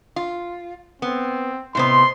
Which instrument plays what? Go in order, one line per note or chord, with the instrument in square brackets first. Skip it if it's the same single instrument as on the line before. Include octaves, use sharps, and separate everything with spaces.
[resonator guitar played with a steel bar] F4
[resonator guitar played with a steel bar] B3 [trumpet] C4
[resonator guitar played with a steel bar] A2 C3 B3 [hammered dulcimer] C5 D#5 [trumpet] C6